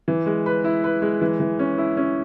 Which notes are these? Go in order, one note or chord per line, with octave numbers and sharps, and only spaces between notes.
E3
G#3
B4
E4
B4
G#3
E3
E3
C#4
E4
C#4